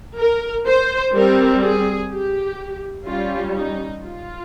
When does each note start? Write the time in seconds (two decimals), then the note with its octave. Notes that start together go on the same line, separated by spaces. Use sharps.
0.17 A#4
0.66 C5
1.13 G3 C4 A#4
1.62 G#4
2.10 G4
3.06 G3 C#4 F4
3.54 D#4
4.03 F4